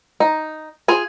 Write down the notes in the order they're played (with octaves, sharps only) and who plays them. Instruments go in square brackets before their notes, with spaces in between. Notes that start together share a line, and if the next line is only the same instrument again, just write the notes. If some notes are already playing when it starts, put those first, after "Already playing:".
[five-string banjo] D#4
F4 G#4 G#5